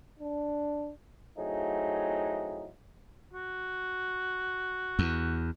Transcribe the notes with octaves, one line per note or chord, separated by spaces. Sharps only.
D4
F#3 A3 C4 D#4 E4 G#4
F#4
E2